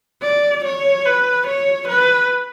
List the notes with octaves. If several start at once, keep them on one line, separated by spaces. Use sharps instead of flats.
D5
C#5
B4
C#5
B4